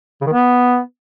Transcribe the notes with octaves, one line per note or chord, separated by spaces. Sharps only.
C#3
D#3
B3